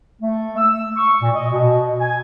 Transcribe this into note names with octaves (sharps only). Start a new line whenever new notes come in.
A3
E6
C#6
A#2
D#5
B2
G#5